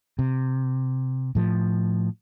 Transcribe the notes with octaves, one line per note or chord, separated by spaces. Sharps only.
C3
A2 F3